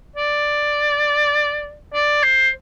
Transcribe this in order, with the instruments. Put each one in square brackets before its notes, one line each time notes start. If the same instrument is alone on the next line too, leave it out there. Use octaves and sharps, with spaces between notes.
[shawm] D5
D5
C5